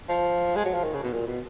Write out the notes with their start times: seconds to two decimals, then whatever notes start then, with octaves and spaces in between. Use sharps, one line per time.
0.09 F3
0.56 G#3
0.65 F#3
0.74 F3
0.84 D#3
0.94 C#3
1.03 B2
1.13 A#2
1.27 B2